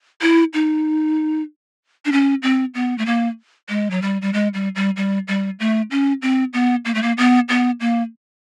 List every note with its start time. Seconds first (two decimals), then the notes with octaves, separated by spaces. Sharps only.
0.22 E4
0.54 D#4
2.05 D4
2.12 C#4
2.43 C4
2.75 B3
2.98 A3
3.06 A#3
3.69 G#3
3.91 F#3
4.02 G3
4.22 G3
4.33 G#3
4.54 G3
4.76 G3
4.97 G3
5.28 G3
5.60 A3
5.91 C#4
6.22 C4
6.53 B3
6.85 A#3
6.95 A3
7.02 A#3
7.18 B3
7.49 B3
7.80 A#3